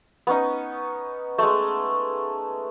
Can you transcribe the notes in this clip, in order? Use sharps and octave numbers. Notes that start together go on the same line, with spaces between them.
B3 C#4 D#4
G#3 A3